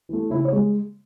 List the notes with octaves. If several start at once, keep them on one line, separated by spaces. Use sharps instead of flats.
E3 A3
C#3 E4
C#5
G#3